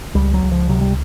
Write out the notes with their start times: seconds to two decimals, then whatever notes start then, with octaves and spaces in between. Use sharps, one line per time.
0.15 C#2 G3
0.34 F#3
0.43 C#2
0.52 F3
0.69 C3 F#3
0.81 G3